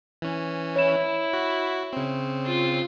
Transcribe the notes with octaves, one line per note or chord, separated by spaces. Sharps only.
E3 C#4
E4 C#5 E7
F#4
C#3 C4
F4